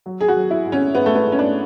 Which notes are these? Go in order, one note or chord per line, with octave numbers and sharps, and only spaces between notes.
F#3
G#4
F#4
F#3
E4
G#2
C#4
G#2 B3
A3
B3
G#2
C#4
D4